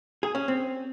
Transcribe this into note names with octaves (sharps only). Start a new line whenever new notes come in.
G#4
C#4
C4